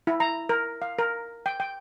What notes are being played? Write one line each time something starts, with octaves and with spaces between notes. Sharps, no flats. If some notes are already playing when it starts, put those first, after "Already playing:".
E4
A#5
A#4
F5
A#4
G5
G5